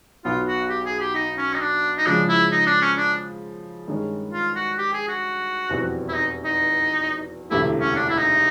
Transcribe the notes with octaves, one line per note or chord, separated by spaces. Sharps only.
B1 B2 F#3 B3 F4
F#4
G4
G#4
G4
D#4
C#4
D#4
D4
D#4
C#3 F3 G#3 D4
E4
D#4
D4
C#4
D4
G2 D#3 G#3 C#4
F4
F#4
G4
G#4
F#4
F1 E2 B2 G3 C4
E4
D#4
D#4
E1 D2 C3 E3 A3 E4
C#4
D4
E4
D#4